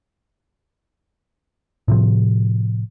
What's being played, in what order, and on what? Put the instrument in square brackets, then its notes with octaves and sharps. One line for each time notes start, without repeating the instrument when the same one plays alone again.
[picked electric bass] A2 C3 F3